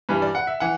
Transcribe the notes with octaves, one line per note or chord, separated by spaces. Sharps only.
G2 E3 G3 B4
D5
F#5
E5
E3 F#5